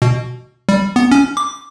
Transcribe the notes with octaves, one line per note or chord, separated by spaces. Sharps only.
B2
G3
B3
C#4
D6